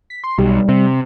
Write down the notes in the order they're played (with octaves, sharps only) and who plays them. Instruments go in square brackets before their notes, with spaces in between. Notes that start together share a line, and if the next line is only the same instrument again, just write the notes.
[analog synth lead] B6
C6
[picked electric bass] B1 [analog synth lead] G3
[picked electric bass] C3